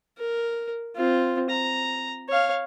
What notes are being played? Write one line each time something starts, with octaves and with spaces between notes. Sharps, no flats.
A#4
C4 F4
A#5
C#5 F5